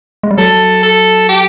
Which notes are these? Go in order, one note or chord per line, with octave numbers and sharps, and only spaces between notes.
G#3
G3
F#3 A4
A4
G4